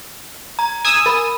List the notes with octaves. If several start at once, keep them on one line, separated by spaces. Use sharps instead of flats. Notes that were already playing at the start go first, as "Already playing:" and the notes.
A#5
G#5 D#6 E6
A#4 B5